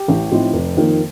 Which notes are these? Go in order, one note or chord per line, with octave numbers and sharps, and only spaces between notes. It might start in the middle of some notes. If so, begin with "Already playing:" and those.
Already playing: G4
A1
A2 F3 C4 D#4
F1
F2 D#3 A#3